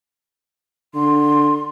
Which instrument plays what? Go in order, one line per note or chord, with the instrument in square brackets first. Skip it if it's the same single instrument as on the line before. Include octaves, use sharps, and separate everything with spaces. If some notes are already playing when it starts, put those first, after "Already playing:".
[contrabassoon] D3 [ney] C6